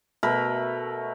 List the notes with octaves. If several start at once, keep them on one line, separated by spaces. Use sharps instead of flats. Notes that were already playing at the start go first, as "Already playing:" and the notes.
B2 A3 A#4 B5